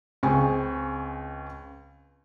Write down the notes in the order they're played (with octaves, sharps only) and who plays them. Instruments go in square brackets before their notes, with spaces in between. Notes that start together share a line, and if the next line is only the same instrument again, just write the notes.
[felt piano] C#2 C4 G#4 G#5 C#6